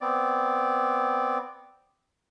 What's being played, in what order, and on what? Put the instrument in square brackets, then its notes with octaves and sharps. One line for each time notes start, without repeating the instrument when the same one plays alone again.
[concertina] B3 C4 D5